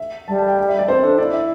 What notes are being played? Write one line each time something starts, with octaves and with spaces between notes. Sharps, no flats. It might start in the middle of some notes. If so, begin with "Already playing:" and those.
Already playing: E5
G3 A5
A5
G5
G5
E5
D5
C4 C5
D4 A4
E4 D5
E5